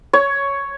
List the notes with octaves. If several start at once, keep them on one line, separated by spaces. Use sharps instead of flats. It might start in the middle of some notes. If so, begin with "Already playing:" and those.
C#5